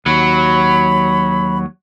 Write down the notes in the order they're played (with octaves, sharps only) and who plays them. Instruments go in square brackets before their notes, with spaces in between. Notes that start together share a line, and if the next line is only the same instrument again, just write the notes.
[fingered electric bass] D#2 [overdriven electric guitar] F#3 [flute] B5